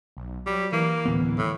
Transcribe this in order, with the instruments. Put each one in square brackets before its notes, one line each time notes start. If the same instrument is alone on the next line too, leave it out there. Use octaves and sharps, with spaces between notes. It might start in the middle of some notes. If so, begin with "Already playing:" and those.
[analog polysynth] B1
[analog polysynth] F#3 [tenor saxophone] G3
[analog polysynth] E3 [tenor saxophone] A#3
[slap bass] D1 B3
[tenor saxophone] A2